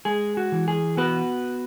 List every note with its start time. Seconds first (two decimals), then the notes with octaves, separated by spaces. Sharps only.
0.05 G#3 G#4
0.37 F#4
0.52 E3
0.68 G#4
0.97 B3 F#4 B4